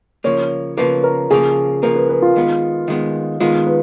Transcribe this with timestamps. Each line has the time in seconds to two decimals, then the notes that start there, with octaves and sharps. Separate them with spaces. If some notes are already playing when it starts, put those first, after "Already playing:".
0.24 C#3 F3 A#3 C#5
0.77 C#3 F3 A#3 B4
1.04 A#4
1.31 C#3 F3 A#3 G#4
1.83 C#3 F3 A#3 A#4
1.96 B4
2.09 B4
2.22 F4
2.36 D#3 G#3 B3
2.88 D#3 G#3 B3
3.40 D#3 G#3 B3 F4
3.67 B4